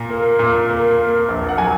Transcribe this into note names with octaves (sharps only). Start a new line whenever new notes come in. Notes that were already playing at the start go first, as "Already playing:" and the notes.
Already playing: A#2 A#5
A#3
A#2
A#3
A#3
A#1
F#5
F#3 G#5